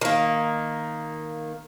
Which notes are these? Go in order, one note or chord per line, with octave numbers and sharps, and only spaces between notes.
D#3 A#3